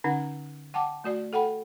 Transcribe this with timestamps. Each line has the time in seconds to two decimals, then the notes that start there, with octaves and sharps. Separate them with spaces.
0.04 D3 C#4 D#4 F#5
0.74 F#5 G5 A5 D6
1.04 A3 F#4 D5
1.33 A4 F#5 G5 B5